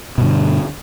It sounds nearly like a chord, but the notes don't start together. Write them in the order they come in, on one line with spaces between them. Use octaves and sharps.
B2 G2 D3